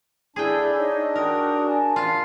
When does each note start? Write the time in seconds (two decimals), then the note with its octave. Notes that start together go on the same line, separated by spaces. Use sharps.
0.36 D4 E4 G#4 A4 D5 G5
0.77 D#4 C#5
1.16 F#4 A#4 G5 D#6
1.66 G#5 A5
1.96 F4